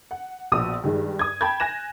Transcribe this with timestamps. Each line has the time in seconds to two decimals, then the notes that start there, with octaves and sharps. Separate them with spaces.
0.11 F#5
0.52 A#1 B2 D#6 E6
0.84 G2 D#3 G#3
1.19 D#6 G#6
1.41 G5 A5 B5 G6 G#6
1.60 G#5 F#6 A#6 E7